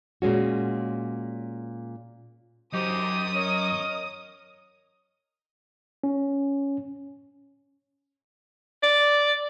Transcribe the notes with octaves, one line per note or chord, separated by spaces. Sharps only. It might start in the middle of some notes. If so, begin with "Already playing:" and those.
A#2 G#3 C#4 F#4
F#2 D#4 G4 C5 D#6
A#4 C#5 D#5
C#4
D5